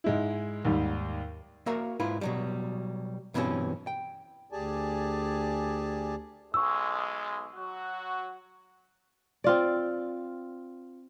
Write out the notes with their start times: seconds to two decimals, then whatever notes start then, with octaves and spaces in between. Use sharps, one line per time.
0.04 G#2 G#3 E4
0.65 D#2 G#2 G3
1.66 A#3 F#4 A#4 E5 F5
2.00 G#2 E4 F4 B4
2.21 B2 F#3 G3
3.34 G2 B2 E3 C4 C#4
3.87 G5
4.52 D2 G4 G#4 D5 G#5 A5
6.54 B1 G#3 C#6 E6
7.56 F#3 F#4
9.44 C4 F4 D5